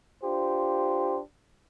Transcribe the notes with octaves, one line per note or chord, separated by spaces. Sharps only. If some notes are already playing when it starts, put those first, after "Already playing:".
D4 F4 G4 C5